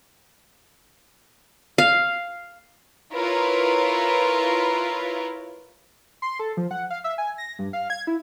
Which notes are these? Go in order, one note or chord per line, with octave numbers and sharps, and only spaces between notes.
F5
E4 F4 A#4 B4 C#5
C6
A4
F3
F#5
F5
E5
G#5
A#6
G2
F5
G#6
E4